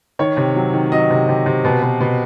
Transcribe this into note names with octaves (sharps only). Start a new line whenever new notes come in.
D#3 C#5
C3
F#3
D#3
F#3 D#5
C3
C3
C3
B2
B2
B2